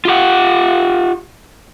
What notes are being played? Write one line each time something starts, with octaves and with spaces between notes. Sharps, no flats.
F4 G4 F#5